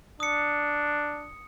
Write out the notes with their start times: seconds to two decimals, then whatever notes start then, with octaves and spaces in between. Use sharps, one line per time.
0.20 D4 D#6 C#7